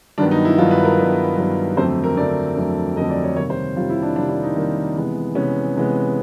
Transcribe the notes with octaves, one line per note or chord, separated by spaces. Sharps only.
G2 D#3 F#3 B3 D4
D#4
E4
G2 D#3 F#3 B3 F4
B4
A#4
G2 D#3 F#3 B3
G2 D#3 F#3 B3
F2 D3 F#3 A3 C4 C5
A#4
F2 D3 F#3 A3 C4 D5
F2 D3 F#3 A3 C4
F2 D3 F#3 A3 C4 D#5
D5
C#5
C3 D#3 G3 A#3 C#5
C5
C3 D#3 G3 A#3 F4
E4
D4
C3 D#3 G3 A#3 D4
D4
D#4
C3 D#3 G3 A#3
C3 E3 G#3 B3
C3 E3 G#3 B3 C#4
C3 E3 G#3 B3